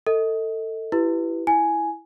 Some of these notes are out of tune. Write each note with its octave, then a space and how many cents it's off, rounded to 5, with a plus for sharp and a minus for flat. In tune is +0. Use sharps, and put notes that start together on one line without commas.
A4 +25 D#5 +30
E4 +20 G4 -10 B4 +0
E4 +0 G#5 +5